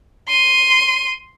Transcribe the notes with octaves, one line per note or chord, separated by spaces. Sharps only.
C6 D#7